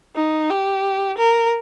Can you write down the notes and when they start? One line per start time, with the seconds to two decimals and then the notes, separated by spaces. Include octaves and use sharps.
0.16 D#4
0.50 G4
1.18 A#4